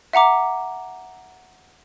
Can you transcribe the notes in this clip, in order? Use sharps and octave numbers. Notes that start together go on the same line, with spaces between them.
E5 F#5 A#5 D6